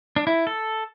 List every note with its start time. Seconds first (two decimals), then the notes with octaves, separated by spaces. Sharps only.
0.16 D4
0.27 E4
0.47 A4